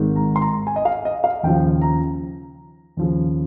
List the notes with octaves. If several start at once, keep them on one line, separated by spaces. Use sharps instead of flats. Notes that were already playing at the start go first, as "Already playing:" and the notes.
Already playing: G#1 G#2 D#3
A#5
C6
A#5
G#5
D#5
F5
D#5
F5
D#2 C#3 F3 G5
A#5
D#2 C#3 F3